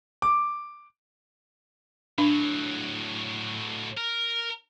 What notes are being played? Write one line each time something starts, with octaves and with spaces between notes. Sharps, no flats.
D6
A2 F#3 D4
A#4